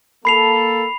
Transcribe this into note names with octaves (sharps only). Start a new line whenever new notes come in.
A#3 A4 B5 C7 F7